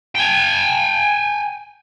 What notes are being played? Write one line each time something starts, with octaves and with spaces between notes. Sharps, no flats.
G5 G#5